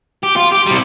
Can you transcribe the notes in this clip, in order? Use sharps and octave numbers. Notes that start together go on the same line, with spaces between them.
G4
F4
G4
C3 G3